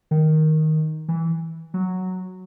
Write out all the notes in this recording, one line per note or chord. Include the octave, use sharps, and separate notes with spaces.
D#3
E3
F#3